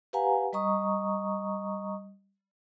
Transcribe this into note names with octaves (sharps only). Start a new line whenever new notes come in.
G4 B4 F5 F#5 G#5 A#5
G3 D#5 A#5 C#6 D#6